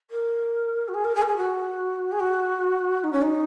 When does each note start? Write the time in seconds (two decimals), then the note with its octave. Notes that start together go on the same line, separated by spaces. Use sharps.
0.10 A#4
0.88 F#4
0.94 G#4
1.04 A#4
1.15 G#4
1.22 A#4
1.26 G#4
1.36 F#4
2.11 G#4
2.19 F#4
3.03 D#4
3.12 C#4
3.22 D#4